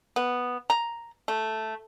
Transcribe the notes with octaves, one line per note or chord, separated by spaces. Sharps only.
B3
A#5
A3